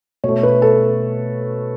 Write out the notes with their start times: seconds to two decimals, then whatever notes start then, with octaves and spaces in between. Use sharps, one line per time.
0.24 B2 A3 C#5
0.43 B4
0.62 A4